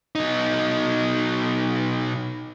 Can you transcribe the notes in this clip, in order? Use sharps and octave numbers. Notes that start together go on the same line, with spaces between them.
B2 D#4